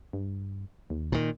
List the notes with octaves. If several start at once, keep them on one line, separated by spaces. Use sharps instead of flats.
G2
D#2
A#2 D#3